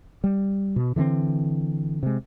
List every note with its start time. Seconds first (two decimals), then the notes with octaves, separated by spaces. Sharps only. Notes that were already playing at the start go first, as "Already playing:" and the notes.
0.24 G3
0.76 B2
0.96 D3 E3 G3 C4
2.03 C3 G#3